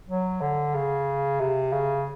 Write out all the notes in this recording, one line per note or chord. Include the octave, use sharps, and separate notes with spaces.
F#3
D3
C#3
C3
C#3